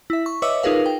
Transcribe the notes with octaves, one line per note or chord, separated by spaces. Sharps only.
E4 E5
C#6
B4 C#5 D#5 E5 D6 E6
D#4 F4 G#4 A#4 B4 F5
G5